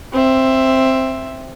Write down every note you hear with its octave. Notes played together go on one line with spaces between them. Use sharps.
C4 E5